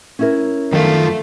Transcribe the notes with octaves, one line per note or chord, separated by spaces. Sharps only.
C#4 E4 A#4
F#2 D#3 F3 A3 F4